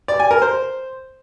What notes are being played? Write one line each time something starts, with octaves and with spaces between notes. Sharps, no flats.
D5
G#5
A#4
C5